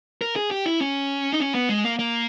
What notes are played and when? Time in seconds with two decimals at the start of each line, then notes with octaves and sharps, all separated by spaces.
0.21 A#4
0.36 G#4
0.51 G4
0.66 E4
0.80 C#4
1.32 D#4
1.40 C#4
1.55 B3
1.69 G#3
1.84 A#3
1.99 A#3